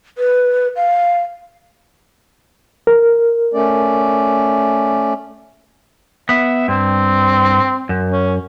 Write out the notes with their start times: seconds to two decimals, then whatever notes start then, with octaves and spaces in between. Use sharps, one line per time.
0.18 B4
0.76 F5
2.87 A#4
3.54 A3 C#4 D5
6.29 B3 E5
6.68 G2 C4
7.89 F#2
8.12 C#4